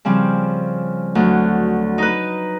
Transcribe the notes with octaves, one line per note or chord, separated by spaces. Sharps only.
C#3 F3 G3 C4
D2 F#3
D#4 B4